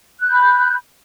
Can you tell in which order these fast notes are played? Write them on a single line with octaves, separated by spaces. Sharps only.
F#6 G6 B5